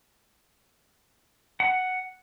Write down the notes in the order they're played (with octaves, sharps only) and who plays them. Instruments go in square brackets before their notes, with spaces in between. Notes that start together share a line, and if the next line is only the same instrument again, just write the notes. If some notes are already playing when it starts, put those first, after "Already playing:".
[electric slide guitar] F#5